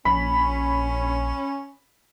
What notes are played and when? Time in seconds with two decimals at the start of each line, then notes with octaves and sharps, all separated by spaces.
0.05 A#1 C#4 B5